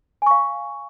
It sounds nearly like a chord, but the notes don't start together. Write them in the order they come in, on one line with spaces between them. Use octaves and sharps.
G#5 C#6 F5